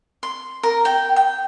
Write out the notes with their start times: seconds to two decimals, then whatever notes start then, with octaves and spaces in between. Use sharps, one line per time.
0.23 C6
0.63 A#4
0.85 G5
1.16 G5